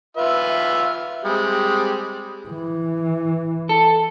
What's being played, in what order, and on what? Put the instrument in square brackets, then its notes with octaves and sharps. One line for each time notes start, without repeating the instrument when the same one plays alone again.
[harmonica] F4 B4 E5
G3 G#3 C4
[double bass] E3
[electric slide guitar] A4